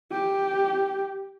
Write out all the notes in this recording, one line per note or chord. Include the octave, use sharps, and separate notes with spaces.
G4